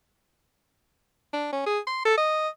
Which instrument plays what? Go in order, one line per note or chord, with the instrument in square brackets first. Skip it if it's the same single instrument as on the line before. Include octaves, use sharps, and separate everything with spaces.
[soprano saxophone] D4
C#4
G#4
C6
A4
D#5